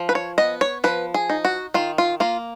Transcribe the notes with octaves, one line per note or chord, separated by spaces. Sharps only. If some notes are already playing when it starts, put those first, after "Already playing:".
Already playing: F3
B4
C#5
B3 D#5
C#5
F3 B4
G#4
D#4
F#4
D#3 F4
F4
A#3 F4